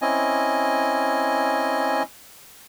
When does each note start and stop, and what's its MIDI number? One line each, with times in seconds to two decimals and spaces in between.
0.02 2.03 60
0.02 2.03 61
0.02 2.03 64
0.02 2.03 75
0.02 2.03 80